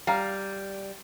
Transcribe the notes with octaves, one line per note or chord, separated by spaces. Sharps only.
G3 F5 A#5